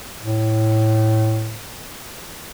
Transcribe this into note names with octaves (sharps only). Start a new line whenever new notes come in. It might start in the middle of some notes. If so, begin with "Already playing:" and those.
A2